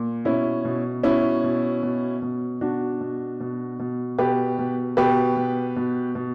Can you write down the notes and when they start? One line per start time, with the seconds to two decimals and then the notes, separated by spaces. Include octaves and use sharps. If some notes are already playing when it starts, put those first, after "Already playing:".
Already playing: A#2
0.25 B2 C#4 E4
0.65 B2
1.03 B2 C#4 E4
1.44 B2
1.83 B2
2.22 B2
2.61 B2 D4 F#4
3.00 B2
3.40 B2
3.79 B2
4.18 B2 G4 B4
4.58 B2
4.97 B2 G4 B4
5.36 B2
5.76 B2
6.15 B2